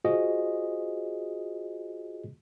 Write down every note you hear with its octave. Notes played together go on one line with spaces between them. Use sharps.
F4 F#4 G#4 C5 D#5